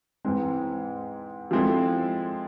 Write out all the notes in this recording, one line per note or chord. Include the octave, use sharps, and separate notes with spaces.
G#2 E3 G#3 C4
F3 G#3 C4 E4 A4